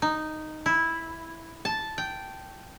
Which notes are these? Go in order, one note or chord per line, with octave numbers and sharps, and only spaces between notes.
D#4
E4
A5
G5